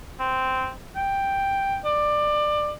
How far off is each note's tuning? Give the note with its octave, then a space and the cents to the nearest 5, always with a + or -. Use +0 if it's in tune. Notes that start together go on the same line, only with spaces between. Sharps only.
C4 -10
G5 +5
D5 +20